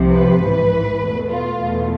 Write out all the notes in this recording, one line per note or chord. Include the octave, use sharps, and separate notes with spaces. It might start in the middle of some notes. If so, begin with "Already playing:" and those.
Already playing: C2 C3 F3
B4
A1 G#2 E3
E2 B2 A3
F4
E2 B2 A3